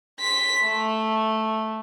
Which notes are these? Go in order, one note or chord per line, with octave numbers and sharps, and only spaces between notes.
C6 B6
A3